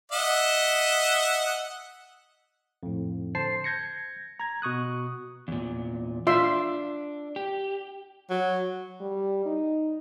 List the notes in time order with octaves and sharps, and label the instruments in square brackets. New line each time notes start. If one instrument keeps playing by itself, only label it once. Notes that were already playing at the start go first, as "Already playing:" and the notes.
[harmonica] D#5 E5 F#5
[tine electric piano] F2 A2
D3 C5 A5 C7
G6 G#6 A#6 C#7
A#5 G#6
B2 C#6 D#6 F#6
[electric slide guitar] E2 A#2
[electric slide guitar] D4 [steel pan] F4 E5 C6
[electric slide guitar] G4
[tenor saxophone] F#3
[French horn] G3
D#4